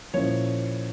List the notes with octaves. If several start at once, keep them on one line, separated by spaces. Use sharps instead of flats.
A#2 F3 A#3 C#4 E4 C#5